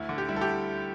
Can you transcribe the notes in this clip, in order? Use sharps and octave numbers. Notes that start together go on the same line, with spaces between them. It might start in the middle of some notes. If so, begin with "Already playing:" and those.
Already playing: D2 E4
D3
G4
G3 E4
A4
G4